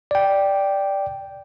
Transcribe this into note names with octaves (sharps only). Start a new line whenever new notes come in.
D5 G5